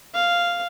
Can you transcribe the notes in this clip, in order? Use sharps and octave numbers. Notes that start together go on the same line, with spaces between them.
F5